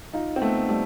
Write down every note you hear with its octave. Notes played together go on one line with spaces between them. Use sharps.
D#4 F4
C4
A3 B3
G3 A3